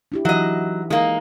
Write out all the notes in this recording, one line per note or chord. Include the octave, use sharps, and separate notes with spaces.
D4 E4 G4
E3 F#3 D#4 D#5 E5
G#3 A#3 D#4